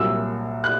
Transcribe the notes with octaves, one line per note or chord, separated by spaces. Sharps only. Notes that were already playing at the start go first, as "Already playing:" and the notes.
Already playing: C2 A#2 F#3 E6
F#6